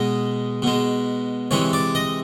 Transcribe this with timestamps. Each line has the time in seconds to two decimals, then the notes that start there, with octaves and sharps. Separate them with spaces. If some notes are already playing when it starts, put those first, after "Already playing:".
Already playing: B2 G#3 D#5
0.62 B2 G#3
1.51 C3 E3 G#3 C#5
1.73 D5
1.95 D#5